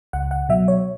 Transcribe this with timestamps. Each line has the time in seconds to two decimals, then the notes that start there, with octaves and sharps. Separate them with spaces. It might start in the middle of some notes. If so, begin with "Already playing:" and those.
0.13 C#2 F#5
0.31 F#5
0.49 B2 F#3 E5
0.68 C#5